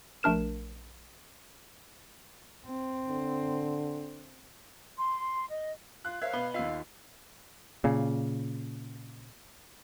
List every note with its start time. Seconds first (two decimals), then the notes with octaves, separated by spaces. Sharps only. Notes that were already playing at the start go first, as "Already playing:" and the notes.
0.23 A#1 A3 D4 A#4 E7
2.68 C4
3.08 D3
4.97 C6
5.50 D#5
6.05 F4 F#6
6.22 A#4 C5 C#5 E5 F5 G#6
6.33 B2 B3 B5
6.54 D#2 F4 D#5 F5 E6
7.84 A#2 C#3